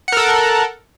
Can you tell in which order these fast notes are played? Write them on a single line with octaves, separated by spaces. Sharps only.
F#5 A#4 A4